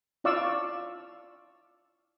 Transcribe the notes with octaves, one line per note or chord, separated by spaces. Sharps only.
E4 F4 D5 F5 C#6 E6